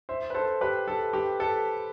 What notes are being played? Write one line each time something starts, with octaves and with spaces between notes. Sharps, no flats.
C5 E5
B4
A4 C5
G4 B4
A4
G4
A4